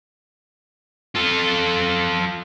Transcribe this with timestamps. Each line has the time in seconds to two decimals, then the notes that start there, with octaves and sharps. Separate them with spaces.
1.15 F4 A4